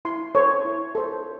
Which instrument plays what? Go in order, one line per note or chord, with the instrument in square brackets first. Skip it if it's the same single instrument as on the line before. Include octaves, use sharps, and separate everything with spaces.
[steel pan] E4 C6
A4 C5 C#5
E4
A4 C5